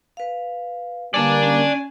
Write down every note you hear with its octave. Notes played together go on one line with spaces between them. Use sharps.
B4 F5
D3 G3 A#3 B4 D5 G#5 A5
C#4